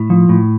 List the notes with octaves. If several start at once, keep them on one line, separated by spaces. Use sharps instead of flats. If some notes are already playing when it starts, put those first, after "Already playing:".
Already playing: A2
F3
A2